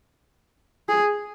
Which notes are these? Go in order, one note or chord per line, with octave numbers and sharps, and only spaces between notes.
G#4